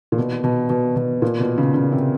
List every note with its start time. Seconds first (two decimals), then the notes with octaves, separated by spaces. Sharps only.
0.12 A#2
0.18 B2
0.44 B2
0.70 B2
0.96 B2
1.22 A#2
1.40 B2
1.58 C#3
1.74 C#3
1.92 C3